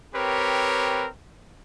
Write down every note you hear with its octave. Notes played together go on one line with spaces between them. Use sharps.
C4 G4 A#4 B4 C#5